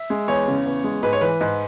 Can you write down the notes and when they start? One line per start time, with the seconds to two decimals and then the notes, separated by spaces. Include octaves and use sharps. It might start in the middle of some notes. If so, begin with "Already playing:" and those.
Already playing: E5
0.10 G#3
0.28 E2 C#5
0.48 C#3
0.66 E2
0.84 G#3
1.03 G#2 B4
1.13 C#5
1.21 E3 B4
1.41 G#2